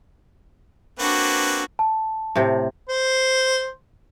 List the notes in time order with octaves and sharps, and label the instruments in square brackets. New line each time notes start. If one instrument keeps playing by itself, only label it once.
[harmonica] A#3 C4 B4 [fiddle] D4 F#4
[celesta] A5
[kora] A2 C3
[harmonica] C5